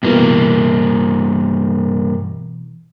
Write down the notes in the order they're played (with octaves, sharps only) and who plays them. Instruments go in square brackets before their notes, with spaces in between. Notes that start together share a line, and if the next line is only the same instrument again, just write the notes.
[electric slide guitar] G2 A#3 [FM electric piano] B2 E3